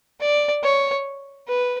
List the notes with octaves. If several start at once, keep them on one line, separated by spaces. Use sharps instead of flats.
D5
C#5
B4